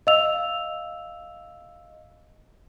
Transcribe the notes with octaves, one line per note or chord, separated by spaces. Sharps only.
D#5 F5 E6 F7